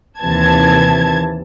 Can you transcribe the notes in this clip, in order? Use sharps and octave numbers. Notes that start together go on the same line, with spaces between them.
D#2 C3 E3 A5 G#6